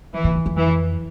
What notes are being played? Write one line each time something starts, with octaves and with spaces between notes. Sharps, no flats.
E3
A#2
E2
F2
E3